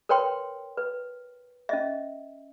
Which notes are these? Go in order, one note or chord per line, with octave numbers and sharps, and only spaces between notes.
A#4 B4 C#5 G5 C6
B4
C#4 D#5 E5